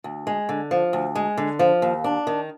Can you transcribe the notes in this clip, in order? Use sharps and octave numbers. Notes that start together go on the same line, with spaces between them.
D2
G#3
D3
F3
D2
G#3
D3
F3
D#2
D4
D#3